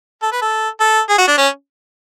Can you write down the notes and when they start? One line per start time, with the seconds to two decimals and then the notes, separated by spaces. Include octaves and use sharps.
0.22 A4
0.32 B4
0.42 A4
0.80 A4
1.09 G#4
1.18 F#4
1.28 D4
1.38 C#4